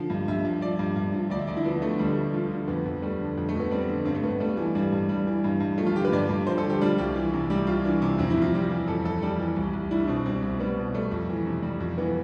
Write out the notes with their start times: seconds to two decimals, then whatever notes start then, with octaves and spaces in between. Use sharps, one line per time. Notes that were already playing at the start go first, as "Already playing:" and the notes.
Already playing: D3 F3
0.10 G2
0.28 G2 E5
0.45 F3
0.61 F3 D5
0.79 G2
0.96 G2
1.14 F3
1.30 D2 D5
1.39 E5
1.47 D2 D5
1.57 E4
1.64 F3 B3
1.82 D3 A3
1.99 D2 G3
2.10 A3
2.17 D2
2.33 F3 F4
2.51 D3
2.68 F2 B3
2.86 F2
3.02 G3 A3
3.19 D3
3.37 F2
3.49 A3
3.55 F2
3.60 B3
3.71 G3 C4
3.89 D3
4.05 G2 C4
4.14 A3
4.23 G2 B3
4.40 G3 A3
4.57 E3
4.75 G2 G3
4.92 G2
5.09 G3
5.27 E3
5.44 G2
5.60 G2
5.78 F3 A3
5.86 F4
5.95 D3 G4
6.04 B4
6.12 G2 D5
6.29 G2
6.47 F3 C5
6.58 A4
6.65 D3 G4
6.81 G3 F4
6.98 C2 G4
7.15 E3
7.33 C3
7.50 G3 G4
7.67 C2 F4
7.84 E3 D4
8.02 C3
8.18 F2 C4
8.30 E4
8.36 F2
8.42 F4
8.54 G3 G4
8.70 E3
8.88 F2 A4
9.05 F2 A4
9.22 G3 G4
9.39 E3
9.56 C2
9.73 C2
9.91 G3 E4
10.00 D4
10.08 B2 C4
10.26 C2 C4
10.42 C2
10.60 G3 B3
10.77 B2
10.94 G3 A3
11.12 F2
11.29 E3
11.46 C3
11.63 G3
11.80 F2
11.98 E3 B3